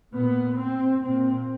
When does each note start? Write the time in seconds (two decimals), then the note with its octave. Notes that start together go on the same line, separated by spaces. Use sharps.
0.14 A#2 B3
0.59 C4
1.04 A#2 C4